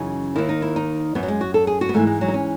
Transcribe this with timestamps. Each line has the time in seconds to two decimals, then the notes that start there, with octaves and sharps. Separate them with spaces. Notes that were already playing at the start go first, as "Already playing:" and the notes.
Already playing: F#2 C#3 E3 D#4
0.35 D#2 D#3 E4
0.49 D#4
0.62 E4
0.76 D#4
1.15 F#2 E3 B3
1.23 F#3
1.28 G#3
1.41 F#4
1.54 A4
1.67 G#4
1.81 F#4
1.89 B3
1.94 G#2 E3 A3
2.07 G#3
2.21 F#3
2.28 D#4
2.34 C#4